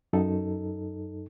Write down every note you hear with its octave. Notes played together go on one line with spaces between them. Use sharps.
F#2 D#4 A4